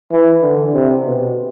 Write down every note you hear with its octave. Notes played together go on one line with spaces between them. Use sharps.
E3
D3
C3
B2